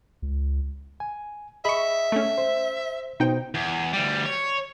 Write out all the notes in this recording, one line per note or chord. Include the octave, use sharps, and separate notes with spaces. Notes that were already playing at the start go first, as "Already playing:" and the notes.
C#2
G#5
G#4 D#5 E5 B5 C#6
A3 C#4
C5
B2 D#4 C5 G5
E2
D2 G3
C#5